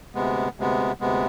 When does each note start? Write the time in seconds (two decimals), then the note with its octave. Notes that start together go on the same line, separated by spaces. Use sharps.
0.15 D2 C3 G#3 B3
0.57 D2 C3 G#3 B3
1.01 D2 C3 G#3 B3